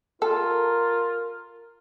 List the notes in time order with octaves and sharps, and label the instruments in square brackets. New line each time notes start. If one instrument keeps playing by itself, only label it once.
[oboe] F4 [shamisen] A4 [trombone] A#4